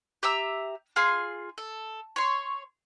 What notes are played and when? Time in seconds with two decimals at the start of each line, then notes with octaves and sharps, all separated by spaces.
0.23 G4 E5 A#5 E6
0.96 F4 G#4 C6
1.58 A4
2.16 C#5 C6